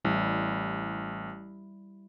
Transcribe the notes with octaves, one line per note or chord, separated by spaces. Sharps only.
A1 G3 E4